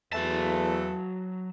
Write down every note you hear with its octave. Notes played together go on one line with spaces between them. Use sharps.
E2 E3 F#3 A3 A4 A5